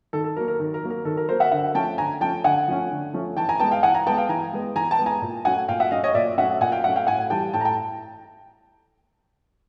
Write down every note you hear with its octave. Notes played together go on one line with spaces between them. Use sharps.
D#3 A4
A4
F#3 A#3 A#4
A#4
D#3
A#4
F#3 A#3
A#4
D#3 A4
A#4
F#3 A#3 A#4 C5
E5 F#5
D3 E5 F#5
F3 A3 C#4 G5 A5
D3 G#5 A#5
F3 A3 C#4 G5 A5
D3 F#5 G#5
F3 A3 C#4
D3
F3 A3 C#4
E3 G5 A5
G#5 A#5
G#3 B3 G5 A5
F5 G5
E3 F#5 G#5
G#5 A#5
G#3 B3 G5 A5
F5 G5
E3 G#5 A#5
G#3 B3
E3 G#5 A#5
G5 A5
G#3 B3
G#5 A#5
A#2
F#3 A3 C#4 F#5 G#5
A#2 F5 G5
E5 F#5
F#3 A3 C#4 D#5 F5
C#5 D#5
A#2 D5 E5
F#3 A3 C#4 E5 F#5
A#2 F#5 G#5
F5 G5
F#3 A3 C#4 E5 F#5
F5 G5
A2 F#5 G#5
E3 G3 G5 A5
A2 G5 A5
A#5
G5 A5